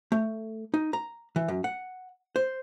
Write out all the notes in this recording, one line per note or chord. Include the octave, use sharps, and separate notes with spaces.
A3
D#4
A#5
E3
F#2
F#5
C5